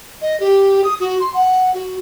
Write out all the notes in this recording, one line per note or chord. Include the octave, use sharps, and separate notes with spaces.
D#5
G4
D#6
F#4
C6
F#5
F#4